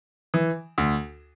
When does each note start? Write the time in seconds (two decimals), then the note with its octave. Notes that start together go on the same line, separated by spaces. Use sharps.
0.34 E3
0.78 D2